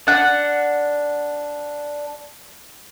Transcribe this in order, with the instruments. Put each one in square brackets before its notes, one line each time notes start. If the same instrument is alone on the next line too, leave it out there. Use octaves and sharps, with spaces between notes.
[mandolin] D4 F#5